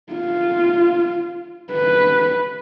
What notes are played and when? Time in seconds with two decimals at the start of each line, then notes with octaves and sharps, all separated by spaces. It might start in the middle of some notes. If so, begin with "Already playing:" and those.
0.13 F4
1.73 B4